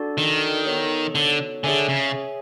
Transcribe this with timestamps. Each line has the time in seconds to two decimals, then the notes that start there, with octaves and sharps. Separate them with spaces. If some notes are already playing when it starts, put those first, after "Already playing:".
Already playing: D4 F#4 A4 D5
0.18 D#3
0.66 B3 D#4 F#4 A4 C#5
1.15 D3
1.64 D3 G#4 C#5 E5 G#5
1.89 C#3